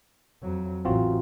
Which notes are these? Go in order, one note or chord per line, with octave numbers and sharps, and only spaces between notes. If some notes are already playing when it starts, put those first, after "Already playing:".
F2 F#3
A1 C4 F4 F#4